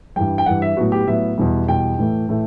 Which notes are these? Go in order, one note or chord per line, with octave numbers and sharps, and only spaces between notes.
G2 E3 G3 G5
G5
G2 E3 G3 F#5
E5
A2 F#3 B3 F#4
G4
A2 F#3 B3 E5
E2 B2 G3
E2 B2 G3 G5
A2 E3 A3
A2 E3 A3